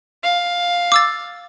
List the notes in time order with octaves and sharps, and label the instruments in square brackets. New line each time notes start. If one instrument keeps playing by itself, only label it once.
[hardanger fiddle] F5
[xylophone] D6 E6 A6